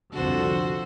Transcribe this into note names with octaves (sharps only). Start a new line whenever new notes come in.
C2 F2 D3 F#4 A4 C5